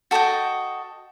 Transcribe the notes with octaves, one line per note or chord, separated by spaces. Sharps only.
F#4 A4 D#5 G5